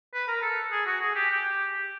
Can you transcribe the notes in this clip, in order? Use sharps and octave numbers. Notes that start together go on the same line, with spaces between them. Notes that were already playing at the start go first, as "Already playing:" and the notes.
B4
A#4
A4
G#4
F#4
G#4
G4
G4